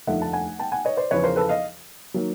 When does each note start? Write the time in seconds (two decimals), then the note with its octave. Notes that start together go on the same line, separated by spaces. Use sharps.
0.07 F1 D#2 D3 F3 A3 E5 F#5
0.22 A5
0.33 F#5 G#5
0.59 G5 A5
0.72 F#5 G#5
0.85 C#5 D#5
0.97 C5 D5
1.11 E2 C#3 F3 B4 C#5
1.23 A#4 C5
1.36 A4 B4
1.49 D#5 F5
2.14 D#3 F#3 A#3